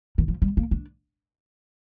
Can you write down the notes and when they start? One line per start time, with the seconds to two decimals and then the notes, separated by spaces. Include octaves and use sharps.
0.18 D#3
0.28 F3
0.42 G3
0.57 A#3
0.71 D4